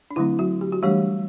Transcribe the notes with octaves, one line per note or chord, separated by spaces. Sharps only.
D4
D3 F#3 A3 C4 E4
F#3 F#4
G4
F#4
E3 G3 A3 D4 G4